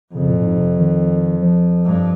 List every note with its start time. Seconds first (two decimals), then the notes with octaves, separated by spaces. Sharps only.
0.14 F2 C#3
0.29 A#2
0.39 A#2
0.43 G#2
0.57 C3
0.79 D#3
1.42 F3
1.85 G2